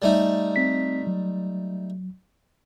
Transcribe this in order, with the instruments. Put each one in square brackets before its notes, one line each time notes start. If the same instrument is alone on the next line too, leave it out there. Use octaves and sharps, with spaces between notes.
[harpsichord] G3 A3 D#4
[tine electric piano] C4 B6
F#3